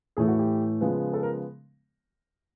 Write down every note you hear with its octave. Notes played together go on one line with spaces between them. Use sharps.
A2 E3 A3 G#4
F#4
G4
C#3 F3 G#3 B3
A4
A#4